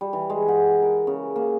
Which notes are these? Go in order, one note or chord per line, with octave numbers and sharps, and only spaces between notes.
G3
E3
G#3
F#5
A#4
C#3
A#3